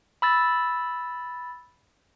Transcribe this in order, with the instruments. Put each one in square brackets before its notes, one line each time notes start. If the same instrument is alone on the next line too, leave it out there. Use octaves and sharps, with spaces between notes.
[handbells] B5 E6 A6